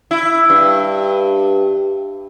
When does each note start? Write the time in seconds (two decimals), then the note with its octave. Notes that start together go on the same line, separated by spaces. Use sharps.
0.11 E4
0.50 G2